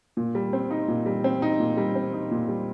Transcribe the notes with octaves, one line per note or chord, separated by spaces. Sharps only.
A#2
G3
C4
D#4
A#2
G3
C4
D#4
A#2
G3
C4
D#4
A#2
G3